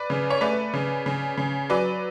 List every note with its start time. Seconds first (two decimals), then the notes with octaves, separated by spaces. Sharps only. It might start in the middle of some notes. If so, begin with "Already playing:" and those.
Already playing: B4 D5
0.10 C#3
0.30 C#5
0.41 A3 B4 D5
0.74 C#3
1.06 C#3
1.37 C#3
1.70 F#3 B4 D5